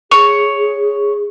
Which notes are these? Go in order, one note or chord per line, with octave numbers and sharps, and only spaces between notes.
G#4 C#5